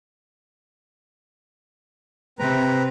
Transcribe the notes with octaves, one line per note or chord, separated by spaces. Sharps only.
C3 C4 B4 A#5